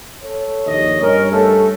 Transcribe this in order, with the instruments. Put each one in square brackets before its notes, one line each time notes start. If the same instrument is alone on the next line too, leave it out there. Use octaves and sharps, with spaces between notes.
[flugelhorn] A4 [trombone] C#5
[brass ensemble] A#1 D#2 D#5
[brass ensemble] G2 C#4 [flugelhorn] A#4
[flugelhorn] A3 [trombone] A4